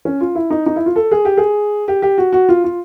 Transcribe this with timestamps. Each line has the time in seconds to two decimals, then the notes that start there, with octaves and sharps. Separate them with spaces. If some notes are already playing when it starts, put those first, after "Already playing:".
0.05 C#4
0.21 F4
0.35 E4
0.50 D#4
0.66 D#4
0.76 E4
0.86 F4
0.96 A4
1.11 G#4
1.25 G4
1.37 G#4
1.88 G4
2.02 G4
2.18 F#4
2.33 F#4
2.49 F4
2.64 F4